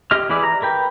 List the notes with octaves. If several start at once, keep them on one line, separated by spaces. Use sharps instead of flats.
G4 D#5 F6
E3 E4 G4 G#4 D5
A#5
A#4 B4 G5